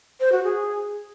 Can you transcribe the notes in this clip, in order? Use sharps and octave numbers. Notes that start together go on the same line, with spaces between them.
C5
F#4
G#4